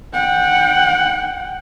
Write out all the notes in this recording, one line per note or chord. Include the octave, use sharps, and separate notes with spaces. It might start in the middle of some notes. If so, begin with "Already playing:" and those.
F#5 G5